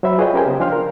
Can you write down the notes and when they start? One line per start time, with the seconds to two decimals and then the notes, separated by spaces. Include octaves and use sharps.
0.03 F#3 C5 E5 B5
0.18 F4 G#4 B4 C#5 D#5 G5
0.34 C#4 G4 A#4 C5 G5 G#5
0.46 C#3 B3
0.60 F3 D4 F5 G5 C6 F6
0.72 A#4